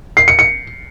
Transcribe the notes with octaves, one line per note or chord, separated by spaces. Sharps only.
C7
C#7
C#7